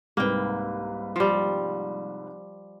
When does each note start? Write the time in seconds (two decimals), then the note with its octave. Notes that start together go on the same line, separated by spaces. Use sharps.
0.17 C2 G#2 A#3 B4 G5
1.16 F3 G3